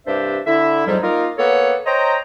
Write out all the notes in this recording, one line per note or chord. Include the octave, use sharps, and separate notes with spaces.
C2 G2 D4 G4 C5 E5
D3 E4 E5
F2 G#2 F#3 G3
A#3 D#4 F4 A#4
A#3 B3 A4 B4 C#5
C5 C#5 D#5 G5 A#5